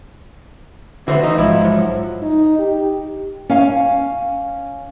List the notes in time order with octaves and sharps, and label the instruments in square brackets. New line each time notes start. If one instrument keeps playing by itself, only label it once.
[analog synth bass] D3 [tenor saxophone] E3 [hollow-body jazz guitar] F#4 C5
[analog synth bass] E3 [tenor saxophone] D#4
[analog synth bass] A#1 [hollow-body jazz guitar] G#2 E4 [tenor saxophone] F3
[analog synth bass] F3 [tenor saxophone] F#3
[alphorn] D#4
G4
[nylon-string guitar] C#4 F5 G#5